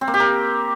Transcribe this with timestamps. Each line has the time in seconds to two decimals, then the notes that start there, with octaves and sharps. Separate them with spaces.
0.01 C4
0.07 A#3
0.14 G4
0.20 A#4